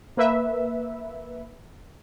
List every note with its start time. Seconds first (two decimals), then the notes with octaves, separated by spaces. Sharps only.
0.17 A#3 B4 E5